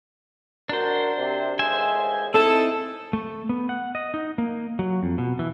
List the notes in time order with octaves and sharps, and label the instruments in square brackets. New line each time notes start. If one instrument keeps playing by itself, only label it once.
[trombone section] A1 F#4 A#4 [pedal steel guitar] D4 C5
[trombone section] C3
[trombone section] A1 D#2 G#3 [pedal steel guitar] C5 E5 G#5
[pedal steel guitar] C4 D#4 E4 [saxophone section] A4
[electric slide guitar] A3
B3
F#5
D#5
D#4
A#3
F#3
F2
B2
E3